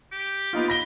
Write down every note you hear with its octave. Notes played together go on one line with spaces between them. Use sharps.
G4
B3 D#4 F4
B5 A#6 G7